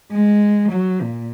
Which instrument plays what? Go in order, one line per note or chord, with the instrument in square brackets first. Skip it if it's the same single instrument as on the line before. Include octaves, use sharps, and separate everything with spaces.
[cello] G#3
F#3
A#2